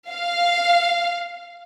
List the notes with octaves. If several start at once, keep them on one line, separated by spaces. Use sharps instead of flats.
F5